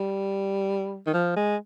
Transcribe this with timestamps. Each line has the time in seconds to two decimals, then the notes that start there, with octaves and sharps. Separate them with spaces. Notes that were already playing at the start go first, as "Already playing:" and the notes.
Already playing: G3
1.06 D#3
1.14 F3
1.36 G#3